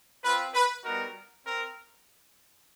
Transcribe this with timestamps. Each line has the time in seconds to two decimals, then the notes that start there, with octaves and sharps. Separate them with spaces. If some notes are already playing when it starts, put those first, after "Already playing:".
0.24 C4 F4 B4
0.53 B4
0.83 G3 B3 D#4 F#4 A#4
1.43 C4 A#4